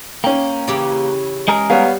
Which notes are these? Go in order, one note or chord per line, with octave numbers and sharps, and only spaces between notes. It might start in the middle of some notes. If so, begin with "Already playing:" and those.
A#3 C#4 G5
C#3 E3 G4
G#3 G#4 A#4
G3 B3 C#5 F5